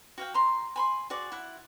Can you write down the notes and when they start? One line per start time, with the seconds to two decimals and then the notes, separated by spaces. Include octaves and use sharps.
0.18 F#4 F5 G5
0.34 A#5 C6
0.76 G#5 B5 C6
1.10 F#4 G#4 D5
1.32 E4 F#5